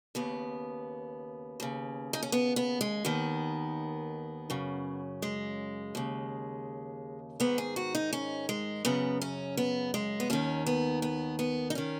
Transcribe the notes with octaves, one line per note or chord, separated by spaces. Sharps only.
D#2 C#3 B3
D#2 C#3
D#4
C#4
B3
B3
G#3
D#2 D#3 B3
F#2 C#3
G#3
D#2 C#3
G#2 D#3 B3
G#4
F#4
D#4
C#4
G#3
F#2 C#3 B3
C#4
B3
G#3
B3
D#2 D#3 C#4
B3
B3
B3
D#4
D#3 C#4